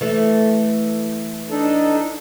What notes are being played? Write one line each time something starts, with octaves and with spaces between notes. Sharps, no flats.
E3 A3
D4 D#4 A4